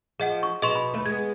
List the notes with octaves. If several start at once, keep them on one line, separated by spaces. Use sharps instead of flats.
F3 G#4 D#5 F#5
C#6
B2 G#4 D#5 C6 C#6 E7
B5
D#2 A3 B4
G#3 B3 G#6